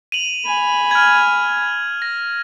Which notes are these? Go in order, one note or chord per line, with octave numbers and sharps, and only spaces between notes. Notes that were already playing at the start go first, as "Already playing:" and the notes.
D#7 F7 F#7
G#5 B5
F6 G#6
A#6